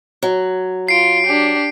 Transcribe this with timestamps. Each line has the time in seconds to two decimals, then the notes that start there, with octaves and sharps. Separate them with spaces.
0.23 F#3
0.88 F4 C7 D7
1.26 D4 G4